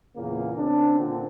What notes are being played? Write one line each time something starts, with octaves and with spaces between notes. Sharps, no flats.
E2 A#2 C#3 A#3
C#3 C4 D4
A#2 D3